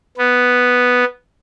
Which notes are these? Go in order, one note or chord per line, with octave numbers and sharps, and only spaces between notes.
B3